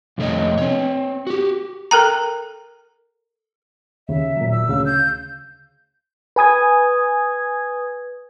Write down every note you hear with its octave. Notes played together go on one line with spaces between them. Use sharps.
F2 C3 A3 D4 C#5 D#5
C4 C#5
F#4 G4
A4 A#4 G5 A#5
D#2 C#3 E5
A#2 F#3
E6
D2 C#3 F5
G6
B4 G#5 D#6 G#6